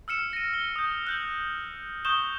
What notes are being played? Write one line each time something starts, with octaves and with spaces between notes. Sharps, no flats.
E6 F6 C#7 E7
A#6 D#7
G7
D#6 G6
F#6 G6 F#7
C#6 D#6 G6 E7 G7